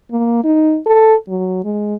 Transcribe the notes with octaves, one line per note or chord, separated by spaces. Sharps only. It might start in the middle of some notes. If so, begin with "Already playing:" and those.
A#3
D#4
A4
F#3
G#3